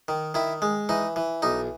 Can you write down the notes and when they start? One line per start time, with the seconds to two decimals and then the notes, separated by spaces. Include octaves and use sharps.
0.08 D#3
0.34 D#3 E4
0.62 G#3
0.89 E3 D#4
1.16 E3
1.42 B1 D#4